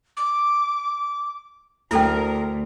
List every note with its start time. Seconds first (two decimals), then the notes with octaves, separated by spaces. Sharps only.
0.17 D6
1.91 D2 E4 A4 A#4 G5